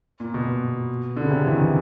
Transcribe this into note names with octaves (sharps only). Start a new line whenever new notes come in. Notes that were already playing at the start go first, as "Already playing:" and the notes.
A#2
B2
D3
C#3
C3
E3
D#3